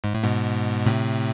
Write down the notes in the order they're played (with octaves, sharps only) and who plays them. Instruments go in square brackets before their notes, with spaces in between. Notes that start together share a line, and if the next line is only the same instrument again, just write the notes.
[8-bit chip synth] G#2
A2
G#2 B2
A2 C3